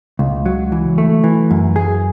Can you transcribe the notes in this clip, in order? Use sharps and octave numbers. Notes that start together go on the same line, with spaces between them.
C#2
F#3
E3
A3
E3
F#2
G#4